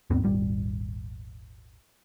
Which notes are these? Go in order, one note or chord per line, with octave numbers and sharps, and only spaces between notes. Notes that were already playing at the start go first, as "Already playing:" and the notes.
D#2 G#2 B3 C4
D#1 G#1 G3